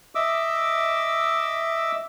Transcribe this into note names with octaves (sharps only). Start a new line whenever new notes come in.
D#5 E5 D6 E6